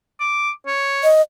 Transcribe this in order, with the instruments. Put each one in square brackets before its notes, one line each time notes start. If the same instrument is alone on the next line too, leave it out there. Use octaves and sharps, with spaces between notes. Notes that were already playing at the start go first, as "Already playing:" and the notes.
[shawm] D6
C#5
[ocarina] D#5